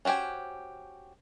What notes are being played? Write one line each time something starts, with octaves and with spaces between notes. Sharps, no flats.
C#4 F#4 G4 C5 G#5